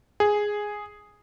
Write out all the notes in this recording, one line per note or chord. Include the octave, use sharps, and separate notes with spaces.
G#4